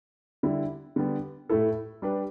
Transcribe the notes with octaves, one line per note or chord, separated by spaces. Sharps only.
D3 G3 E4
D3 G3 B3
A2 A3 E4 A4
G3 D4 G4 B4